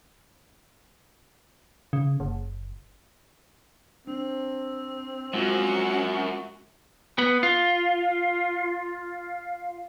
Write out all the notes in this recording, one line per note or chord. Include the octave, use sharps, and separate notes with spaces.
C#3
F#1
C4 D4
F#2 G#3 F4 F#4
B3
F4